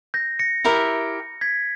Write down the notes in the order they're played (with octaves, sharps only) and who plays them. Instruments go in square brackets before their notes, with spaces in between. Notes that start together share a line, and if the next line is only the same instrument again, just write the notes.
[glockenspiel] G6 A#6
A#6 C#7
[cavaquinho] E4 G4 A#4 E5
[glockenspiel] G#6 B6